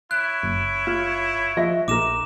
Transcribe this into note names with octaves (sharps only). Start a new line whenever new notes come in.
E4 C#5 F#6
F#1
F4
F3 D#5 E5
A#1 D#4 A#4 D6 E7